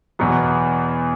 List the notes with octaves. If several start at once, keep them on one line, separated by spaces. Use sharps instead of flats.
E2 B2 F#3 B3